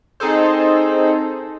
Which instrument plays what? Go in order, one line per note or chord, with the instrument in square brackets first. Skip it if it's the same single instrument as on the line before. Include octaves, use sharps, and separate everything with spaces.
[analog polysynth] C4 D#4 G#4 A4 C5